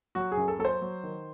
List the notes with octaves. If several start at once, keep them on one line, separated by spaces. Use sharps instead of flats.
F#3 F#4
G#4
F#2
A4
F#3 A4
C5
F#3
D#3